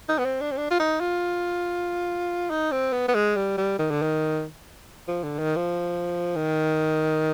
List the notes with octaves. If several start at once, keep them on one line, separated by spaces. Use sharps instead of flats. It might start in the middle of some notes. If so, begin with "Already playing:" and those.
D#4
B3
C4
D4
C4
D4
F4
D#4
F4
D#4
C4
B3
B3
G#3
G3
G3
D#3
D3
D#3
F3
D3
D#3
F3
D#3